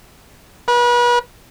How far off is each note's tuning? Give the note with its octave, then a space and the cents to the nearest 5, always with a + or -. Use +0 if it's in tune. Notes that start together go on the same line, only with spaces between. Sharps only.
B4 -35